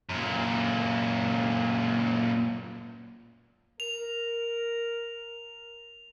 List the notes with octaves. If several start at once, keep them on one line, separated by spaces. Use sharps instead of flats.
F#2 A#2
A#4 F7